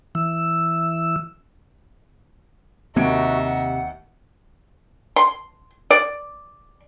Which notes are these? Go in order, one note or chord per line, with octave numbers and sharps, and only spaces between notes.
E3 E6
D#2 C3 D#4 F#4 E5 G#6 D7
F#5
C6
D5